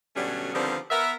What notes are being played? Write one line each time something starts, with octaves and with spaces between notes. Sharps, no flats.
B2 D3 F#3 G3 A3 C#4
D3 D#3 F3 G3 B3 C4
B3 A#4 E5